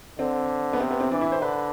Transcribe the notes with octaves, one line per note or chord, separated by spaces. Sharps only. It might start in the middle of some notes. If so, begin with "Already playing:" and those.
D3 C4
B3
C3 C4
B3
C4
E3 D4
E4
C5
D3 B4